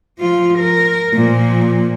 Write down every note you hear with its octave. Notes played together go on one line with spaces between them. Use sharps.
F3 F4
A#4
A#2 F3